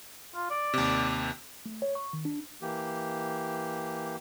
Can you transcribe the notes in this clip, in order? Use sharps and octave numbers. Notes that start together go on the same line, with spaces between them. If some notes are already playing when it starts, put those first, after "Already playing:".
F4
D5
D#2 C3
A3
C#5
C#6
D#3
D4
E3 A#3 G4